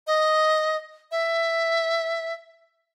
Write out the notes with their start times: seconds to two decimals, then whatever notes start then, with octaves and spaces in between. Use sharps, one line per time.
0.07 D#5
1.11 E5